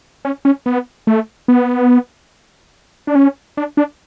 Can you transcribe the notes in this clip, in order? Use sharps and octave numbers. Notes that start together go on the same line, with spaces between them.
C#4
C#4
B3
A3
B3
D4
C#4
D4
D4